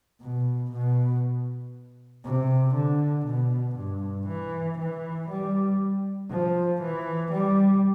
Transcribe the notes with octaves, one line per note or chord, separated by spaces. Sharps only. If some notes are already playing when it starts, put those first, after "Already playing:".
B2
B2
C3
D3
B2
G2
E3
E3
G3
F3
E3
G3